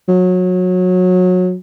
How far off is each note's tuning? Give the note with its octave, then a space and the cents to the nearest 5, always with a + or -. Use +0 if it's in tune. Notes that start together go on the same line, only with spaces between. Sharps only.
F#3 -25